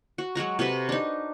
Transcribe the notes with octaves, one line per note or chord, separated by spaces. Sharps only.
F#4
F#3 G#3 F#4 A#5
C3 F#4 A4 B4
D4 D#4